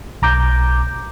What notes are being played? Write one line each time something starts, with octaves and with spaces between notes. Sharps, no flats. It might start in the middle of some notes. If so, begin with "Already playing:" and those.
B1 A#5 D6 G6